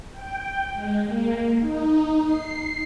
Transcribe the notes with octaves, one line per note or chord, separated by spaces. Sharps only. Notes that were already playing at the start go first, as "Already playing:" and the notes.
G5
G#3
A#3
D#4
C7